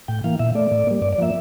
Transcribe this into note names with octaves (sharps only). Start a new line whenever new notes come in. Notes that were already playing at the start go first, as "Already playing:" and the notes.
A2 G5
E3 A#3 F5
A#2 E5
A3 D5
A2
G3 A#3
G2 D5
D5
F3 A#3 E5